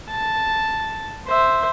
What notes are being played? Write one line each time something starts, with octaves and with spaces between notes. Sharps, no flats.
A5
C5 E5